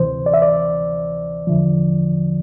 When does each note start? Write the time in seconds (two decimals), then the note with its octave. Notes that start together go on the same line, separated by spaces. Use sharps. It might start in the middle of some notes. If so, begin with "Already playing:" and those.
Already playing: D2 C3 E3 C5
0.26 D5
0.34 E5
0.42 D5
1.47 E2 D3 F3